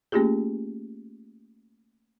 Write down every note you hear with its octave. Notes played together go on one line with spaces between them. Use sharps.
A3 A#3 C#4 F4 G4 G#4